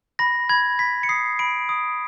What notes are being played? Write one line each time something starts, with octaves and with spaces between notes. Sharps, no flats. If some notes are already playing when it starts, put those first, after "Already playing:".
B5 A#6
B5 G#6
B5 B6
C#7
D#6 C7
B5 D7
D#6